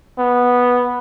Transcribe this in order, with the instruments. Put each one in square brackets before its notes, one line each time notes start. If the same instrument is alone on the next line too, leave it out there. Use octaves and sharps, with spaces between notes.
[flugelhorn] B3